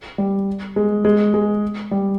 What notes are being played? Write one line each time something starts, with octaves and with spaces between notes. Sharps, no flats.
G3
G#3
G#3
G#3
G3